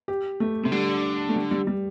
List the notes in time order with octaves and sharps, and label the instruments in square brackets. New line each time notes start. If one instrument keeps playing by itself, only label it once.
[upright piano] G4
A3
[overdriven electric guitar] C3 [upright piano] A3
[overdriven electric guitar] D3 [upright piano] G3
[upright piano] A3
G3
G3
G3